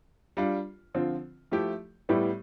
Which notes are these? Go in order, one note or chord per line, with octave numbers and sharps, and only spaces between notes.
G3 D4 F4
D3 F3 C4 F4
F3 A3 E4 G4
A2 G3 B3 E4 G4